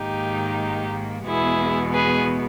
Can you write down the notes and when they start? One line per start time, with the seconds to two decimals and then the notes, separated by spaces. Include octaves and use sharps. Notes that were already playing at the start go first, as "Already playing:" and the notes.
Already playing: G#2 D#3 A#3 D#4 G4
1.26 E2 B2 G#3 B3 E4 G#4
1.94 G#4 B4